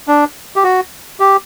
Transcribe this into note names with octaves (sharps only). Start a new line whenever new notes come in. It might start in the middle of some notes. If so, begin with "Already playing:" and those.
D4
G4
F#4
G4